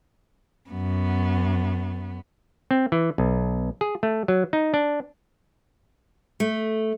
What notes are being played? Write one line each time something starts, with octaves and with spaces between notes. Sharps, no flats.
F#2 B3
C4
E3
B1
G#4
A3
F#3
D#4
D4
A3